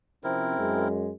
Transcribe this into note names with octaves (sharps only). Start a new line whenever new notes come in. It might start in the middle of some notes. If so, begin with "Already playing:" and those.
C3 F3 C4 C#4 E4 A#4
F#2 G#3